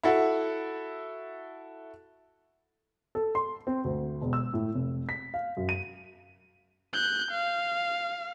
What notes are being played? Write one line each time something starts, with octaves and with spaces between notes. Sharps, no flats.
E4 F#4 A4
A4
C6
C4
D2
E1
E6
A2
F1
B6
F5
F#2
D#7
F#6 G6
F5